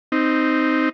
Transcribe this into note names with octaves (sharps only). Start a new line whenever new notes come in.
C4 D#4